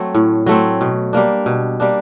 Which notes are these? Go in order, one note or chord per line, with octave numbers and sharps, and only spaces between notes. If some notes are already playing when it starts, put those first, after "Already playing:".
Already playing: F#3 A3 C4
A2
F#3 A3 C4
B2
G3 A#3 D4
B2
G3 A#3 D4